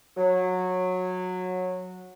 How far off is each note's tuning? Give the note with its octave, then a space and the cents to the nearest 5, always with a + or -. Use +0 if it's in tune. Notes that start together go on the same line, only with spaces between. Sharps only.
F#3 -15